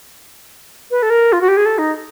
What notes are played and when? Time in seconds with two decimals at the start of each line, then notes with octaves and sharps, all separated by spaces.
0.91 B4
1.03 A4
1.10 A#4
1.32 F4
1.41 F#4
1.48 G4
1.57 G#4
1.65 A4
1.78 D#4